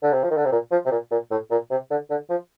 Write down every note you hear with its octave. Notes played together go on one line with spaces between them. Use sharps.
D3
C3
F3
D#3
D3
C3
A#2
F3
C3
A#2
A#2
A2
A#2
C3
D3
D3
F3